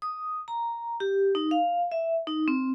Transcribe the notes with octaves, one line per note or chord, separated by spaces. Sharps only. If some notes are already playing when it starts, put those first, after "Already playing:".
D#6
A#5
G4
D#4
F5
E5
D#4
C4